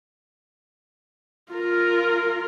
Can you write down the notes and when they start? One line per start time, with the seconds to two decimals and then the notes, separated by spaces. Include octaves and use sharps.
1.52 F4 A#4